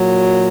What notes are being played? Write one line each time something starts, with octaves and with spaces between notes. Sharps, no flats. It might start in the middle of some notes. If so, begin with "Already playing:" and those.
Already playing: A#2 F#3